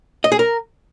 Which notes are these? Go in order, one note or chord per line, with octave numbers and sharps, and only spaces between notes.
D#5
G#4
A#4